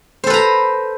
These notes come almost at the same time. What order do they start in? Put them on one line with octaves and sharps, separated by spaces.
C5 A4 B4 A#5